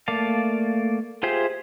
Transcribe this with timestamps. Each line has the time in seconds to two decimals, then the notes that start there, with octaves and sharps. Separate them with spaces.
0.08 A3 A#3 D5 F5 A5
1.23 F4 G4 G#4 C5 E5